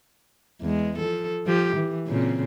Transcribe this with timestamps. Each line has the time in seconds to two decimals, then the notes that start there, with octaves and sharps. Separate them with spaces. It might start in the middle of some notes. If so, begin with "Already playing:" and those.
0.61 E2 G#3
0.99 F3 A4
1.46 F3 G4
1.76 E3
2.08 A#2 C#3 C4